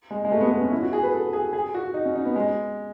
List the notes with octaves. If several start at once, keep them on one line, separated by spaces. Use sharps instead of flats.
G#3
G#3
A3
B3
A3
B3
C#4
E4
F#4
G#4
B4
A4
G#4
G#4
F#4
D#4
C#4
D#4
B3
G#3